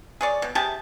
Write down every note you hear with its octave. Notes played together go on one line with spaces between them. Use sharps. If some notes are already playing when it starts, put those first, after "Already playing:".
G#4 C#5 D5
B2
C3 G4 G#4 A5